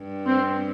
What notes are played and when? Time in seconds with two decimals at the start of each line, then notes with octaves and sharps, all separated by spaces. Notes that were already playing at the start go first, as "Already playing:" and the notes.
Already playing: G2
0.26 C4